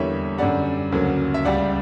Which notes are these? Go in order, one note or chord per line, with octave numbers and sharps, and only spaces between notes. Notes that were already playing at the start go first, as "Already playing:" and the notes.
Already playing: E2 D3 G3 A#3 C#5 E5
F#2 D3 G3 D5 F#5
D2 C#3 F#3 A#3
E5
C#2 C#3 G3 D5 F#5